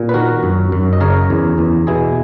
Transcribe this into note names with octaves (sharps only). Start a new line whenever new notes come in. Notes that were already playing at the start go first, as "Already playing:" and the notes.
Already playing: A#2
B4
D#3 F#4 A#4
F#2
F#2
D#5
C#3 A#4 C#5
E2
E2
B2 E4 G#4